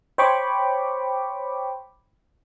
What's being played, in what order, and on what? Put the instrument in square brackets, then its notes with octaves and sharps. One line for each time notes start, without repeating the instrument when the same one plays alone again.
[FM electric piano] C5 C#5 G5 B5 C#6 D6